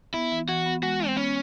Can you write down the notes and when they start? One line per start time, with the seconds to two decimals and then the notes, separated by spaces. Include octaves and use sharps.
0.14 B3 E4
0.32 E3
0.49 E3 F#4
0.66 B3
0.82 G#3 F#4
1.00 G#3
1.07 C4
1.17 B3 C#4